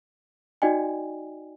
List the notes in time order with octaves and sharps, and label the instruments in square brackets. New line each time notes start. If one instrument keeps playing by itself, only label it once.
[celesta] D#4 F#4 D5 D#5 G5 G#5